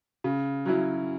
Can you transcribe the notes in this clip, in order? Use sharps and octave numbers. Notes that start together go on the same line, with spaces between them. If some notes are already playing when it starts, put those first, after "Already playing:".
C#3
F#3 C#4 E4